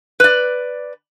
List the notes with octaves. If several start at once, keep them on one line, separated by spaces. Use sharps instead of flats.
B4 D5